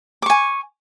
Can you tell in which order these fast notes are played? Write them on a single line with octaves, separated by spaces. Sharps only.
D6 C#6 G#5